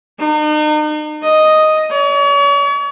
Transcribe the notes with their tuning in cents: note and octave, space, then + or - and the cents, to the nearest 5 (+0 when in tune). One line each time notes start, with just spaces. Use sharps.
D#4 -40
D#5 +0
C#5 +40